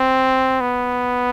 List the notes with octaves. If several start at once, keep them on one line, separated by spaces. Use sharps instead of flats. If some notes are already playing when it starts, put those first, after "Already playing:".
Already playing: C4
B3